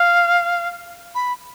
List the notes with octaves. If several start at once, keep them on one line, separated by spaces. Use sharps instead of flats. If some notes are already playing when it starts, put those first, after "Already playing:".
Already playing: F5
B5